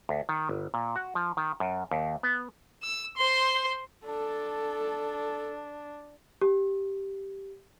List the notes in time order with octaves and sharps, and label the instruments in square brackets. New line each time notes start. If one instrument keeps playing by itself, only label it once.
[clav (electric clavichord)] D2
D#3
G1
A#2
F#4
F3
D#3
F#2
D#2
B3
[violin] E6
C5 C6
[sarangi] D4 [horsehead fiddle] A4
[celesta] G4